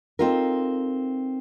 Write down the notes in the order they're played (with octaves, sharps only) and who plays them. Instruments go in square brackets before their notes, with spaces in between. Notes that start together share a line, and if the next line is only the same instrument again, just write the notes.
[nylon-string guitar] C4 D#4 F4 A4 A#4